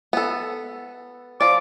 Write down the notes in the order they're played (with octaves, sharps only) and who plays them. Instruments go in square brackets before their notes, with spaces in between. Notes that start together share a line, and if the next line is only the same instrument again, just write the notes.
[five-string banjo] B3 A4
[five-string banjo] F3 D5 [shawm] D6